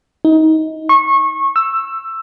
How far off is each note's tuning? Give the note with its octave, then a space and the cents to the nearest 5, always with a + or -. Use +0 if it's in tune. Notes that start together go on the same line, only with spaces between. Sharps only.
D#4 +25
C#6 -25
E6 +10